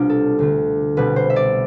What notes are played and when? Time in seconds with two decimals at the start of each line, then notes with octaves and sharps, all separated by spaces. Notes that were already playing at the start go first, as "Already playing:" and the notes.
Already playing: C2 B2 G3 D4 F4 G4
0.10 A4
0.39 D2 D3 A3
0.97 C2 B2 G3 B4
1.16 C5
1.30 E5
1.36 D5